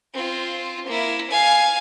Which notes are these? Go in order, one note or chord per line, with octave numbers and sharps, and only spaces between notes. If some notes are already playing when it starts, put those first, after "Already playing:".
C4 F4
A#3 E4
F5 G#5